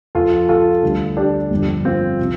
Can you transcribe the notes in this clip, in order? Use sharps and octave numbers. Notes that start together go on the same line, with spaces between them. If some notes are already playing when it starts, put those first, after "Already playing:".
F2 F3 F4 A4
F4 A4
D2 D3 G3
D4 G4
G1 F2 D3
C4 F4
C3 F3